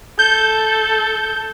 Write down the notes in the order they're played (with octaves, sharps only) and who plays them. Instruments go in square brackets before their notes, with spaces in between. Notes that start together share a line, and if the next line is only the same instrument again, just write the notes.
[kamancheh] A4 [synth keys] G6